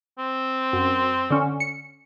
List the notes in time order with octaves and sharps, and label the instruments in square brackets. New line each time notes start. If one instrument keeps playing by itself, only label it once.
[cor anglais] C4
[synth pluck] F#2
D3 C#4
C#7